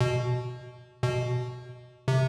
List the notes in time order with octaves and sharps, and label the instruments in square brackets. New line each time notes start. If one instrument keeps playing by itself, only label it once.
[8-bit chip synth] B2
B2
C3